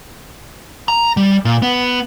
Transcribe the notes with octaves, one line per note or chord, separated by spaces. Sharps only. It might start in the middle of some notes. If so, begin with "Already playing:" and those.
A#5
G3
A#2
B3